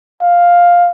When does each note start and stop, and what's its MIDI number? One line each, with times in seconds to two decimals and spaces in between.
0.21 0.91 77